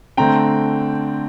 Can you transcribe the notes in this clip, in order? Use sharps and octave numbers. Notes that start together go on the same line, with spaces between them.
D3 A3 C4 G5 A#5